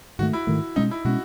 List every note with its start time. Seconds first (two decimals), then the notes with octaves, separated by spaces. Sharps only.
0.19 G#2 D#3 A3 F#4
0.33 E4
0.47 G#2 D#3 A3
0.76 B2 G#3 C#4 D#4
0.91 E4
1.05 B2 G#3 C#4 F#4